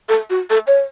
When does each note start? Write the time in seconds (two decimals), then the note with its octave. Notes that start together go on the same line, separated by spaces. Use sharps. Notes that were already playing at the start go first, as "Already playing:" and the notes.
0.09 A4
0.30 F#4
0.50 A4
0.67 C#5